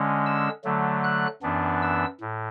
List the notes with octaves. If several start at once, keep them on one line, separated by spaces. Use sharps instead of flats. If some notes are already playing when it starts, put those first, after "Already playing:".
Already playing: D3 G#3 C#4
E6
D3 F#3 A3
F#6
F#2 E3 B3 D4
E6
A2